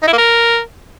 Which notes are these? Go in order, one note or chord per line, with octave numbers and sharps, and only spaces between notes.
D#4
E4
A#3
A#4